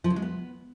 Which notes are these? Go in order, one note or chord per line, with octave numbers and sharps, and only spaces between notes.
F3
C#3
G#3
B3